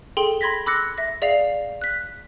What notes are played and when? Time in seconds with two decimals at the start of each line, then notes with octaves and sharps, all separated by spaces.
0.17 G#4 A4 G5 C6 G7
0.41 B5 C6 G#6 A#6 B6
0.66 B5 D6 E6 F#6 A#6 C#7
0.98 E5 A#6
1.22 G#4 D5 E5 F5 C7 F7
1.82 F#6 B6